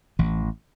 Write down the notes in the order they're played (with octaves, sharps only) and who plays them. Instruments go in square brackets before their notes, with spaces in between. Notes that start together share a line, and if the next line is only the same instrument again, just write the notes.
[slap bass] A1 E3